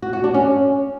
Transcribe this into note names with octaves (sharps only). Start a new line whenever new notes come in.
F#4
F#4
D4
C#4